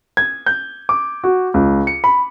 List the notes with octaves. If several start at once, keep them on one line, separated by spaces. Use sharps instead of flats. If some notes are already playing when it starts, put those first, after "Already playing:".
G#6
G6
D6
F#4
C#2
C#7
B5